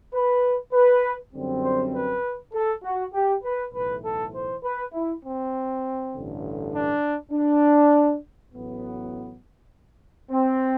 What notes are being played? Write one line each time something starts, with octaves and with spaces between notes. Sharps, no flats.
B4
B4
F#2 D3 G3 C4
C5
B4
A4
F#4
G4
B4
B1 A2 E3 B4
A4
C5
B4
E4
C4
A1 G2 D3
D4
D4
A1 A2 F#3 B3
C4